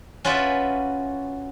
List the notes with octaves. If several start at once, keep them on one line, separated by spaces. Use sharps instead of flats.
C#4 F4 F#4 B4 D5 E5